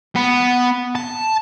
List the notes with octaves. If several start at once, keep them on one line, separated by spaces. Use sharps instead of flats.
B3
A5